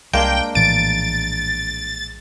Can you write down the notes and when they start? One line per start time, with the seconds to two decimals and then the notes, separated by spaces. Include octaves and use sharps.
0.13 C2 G#3 A#3 D4 G5
0.55 A#1 A2 E3 A6 D7